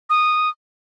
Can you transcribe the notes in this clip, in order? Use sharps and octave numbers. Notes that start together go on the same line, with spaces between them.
D#6